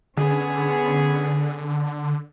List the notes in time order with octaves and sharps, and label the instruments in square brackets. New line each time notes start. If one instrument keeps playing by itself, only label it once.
[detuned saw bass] D3 [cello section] B3 C#4 G#4